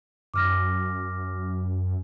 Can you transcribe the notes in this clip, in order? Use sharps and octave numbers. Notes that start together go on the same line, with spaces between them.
F#2 D6 F6 A#6